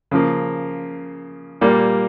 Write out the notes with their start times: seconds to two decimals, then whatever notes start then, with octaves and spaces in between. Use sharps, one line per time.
0.11 C#3 F3 A#3
1.61 A#2 G3 A#3